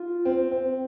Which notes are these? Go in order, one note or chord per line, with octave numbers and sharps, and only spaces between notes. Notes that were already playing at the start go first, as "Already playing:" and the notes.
Already playing: F4
C4
C4